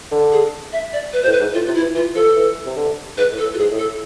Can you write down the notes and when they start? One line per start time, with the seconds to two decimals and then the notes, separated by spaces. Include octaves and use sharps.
0.12 D3
0.32 G#4
0.72 E5
0.93 D5
1.13 B4
1.23 B2 C5
1.27 A2
1.32 B4
1.40 G#2
1.54 A2 F4
1.66 C3 F4
1.75 E4
1.81 E3
1.95 E3 F4
2.15 F3 A4
2.36 E3
2.66 C3
2.77 D3
3.17 G#2 B4
3.32 A2
3.38 A4
3.44 A2
3.54 F4
3.58 G#2 G#4
3.70 A2
3.78 A4